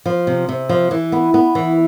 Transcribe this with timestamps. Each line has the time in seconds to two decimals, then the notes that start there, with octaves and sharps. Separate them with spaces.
0.06 F3
0.27 C3
0.49 C3
0.69 F3
0.91 E3
1.12 B3
1.34 B3
1.55 E3